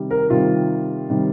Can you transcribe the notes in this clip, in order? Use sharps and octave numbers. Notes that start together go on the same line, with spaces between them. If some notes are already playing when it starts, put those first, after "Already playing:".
Already playing: C3 D#3 G3
A#4
C3 D#3 G3 F4
C3 D#3 G3